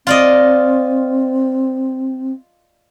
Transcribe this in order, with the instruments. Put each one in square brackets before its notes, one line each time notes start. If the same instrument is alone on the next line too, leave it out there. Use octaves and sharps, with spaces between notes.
[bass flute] C4 [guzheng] F4 D5 D#5